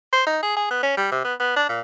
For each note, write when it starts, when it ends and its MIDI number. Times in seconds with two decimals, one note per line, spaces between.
0.13 0.24 72
0.27 0.42 63
0.43 0.55 68
0.57 0.68 68
0.71 0.80 59
0.83 0.92 61
0.97 1.08 55
1.12 1.20 48
1.24 1.34 59
1.40 1.56 59
1.56 1.67 62
1.69 1.80 46